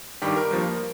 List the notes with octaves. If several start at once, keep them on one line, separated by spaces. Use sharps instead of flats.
G2 D#3 G3 G4
A#4
G2 F3 A#3